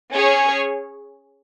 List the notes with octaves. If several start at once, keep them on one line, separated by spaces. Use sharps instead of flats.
C#4 G#4 C#5